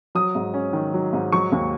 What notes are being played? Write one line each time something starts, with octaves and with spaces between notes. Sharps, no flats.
F#3 D#6
G#2
C#4
D#3
F#3
G#2
F#3 C#6
D#2